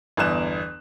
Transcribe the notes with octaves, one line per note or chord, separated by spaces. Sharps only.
G1 E2 F#6 E7